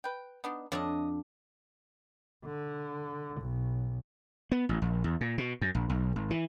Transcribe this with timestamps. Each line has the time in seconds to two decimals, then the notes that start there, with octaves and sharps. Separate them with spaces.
0.04 B4 G5
0.44 B3 D4 D#4
0.72 F2 D4 F4 C#5 D#5
2.45 D3
3.41 B1
4.52 B3
4.69 A1
4.82 A#1
5.04 E2
5.21 A#2
5.38 B2
5.61 F#2
5.75 A#1
5.89 B1
6.16 G#1
6.31 E3